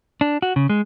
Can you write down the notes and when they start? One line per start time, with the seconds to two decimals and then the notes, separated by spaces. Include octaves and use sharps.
0.21 D4
0.42 F#4
0.56 C#3
0.69 G#3